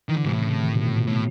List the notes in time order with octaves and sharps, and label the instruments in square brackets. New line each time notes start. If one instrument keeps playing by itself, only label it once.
[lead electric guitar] D#3 [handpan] E3
[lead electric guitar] D3
[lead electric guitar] G#2 [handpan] C3
[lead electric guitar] A2
[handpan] C#3
D#3
B2
A#2
B2
[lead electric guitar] A2